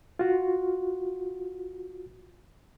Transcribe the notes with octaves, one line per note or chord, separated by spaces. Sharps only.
F4 F#4